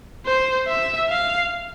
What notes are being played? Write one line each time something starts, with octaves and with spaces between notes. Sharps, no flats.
C5
E5
F5